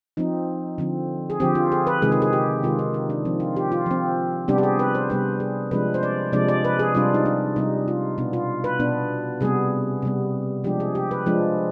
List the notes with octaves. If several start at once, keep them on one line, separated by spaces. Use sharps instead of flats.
F3 C4 D#4
D3 F3 C4
G#4
D3 F3 C4 G4
F4
G#4
B4
C3 D#3 G#3 G#4
B4
G#4
G4
C3 D#3 G#3 F4
D#4
D#4
D4
F3 C4
F4
G4
F4
F3 C4
C3 G3 B3 D4 G4
G4
G#4
B4
C5
C3 G3 B3 D4 B4
G#4
C3 F3 G#3 D4 B4
C5
D5
C3 F3 G#3 D4 D5
D5
B4
G#4
C3 G3 D4 F4
D#4
D4
C3 G3 D4 D#4
F4
B2 B3 D4
F4
B4
B2 B3 D4
C3 G3 B3 G#4
C3 G3 B3
F3 G#3 D4 G4
G#4
G4
B4
F3 G#3 D4